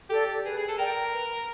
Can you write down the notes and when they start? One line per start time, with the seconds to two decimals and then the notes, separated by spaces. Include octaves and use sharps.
0.10 G4 A4 D5
0.45 G#4 B4
0.57 G#4
0.68 A4
0.78 A#4 D5 G5
1.12 B4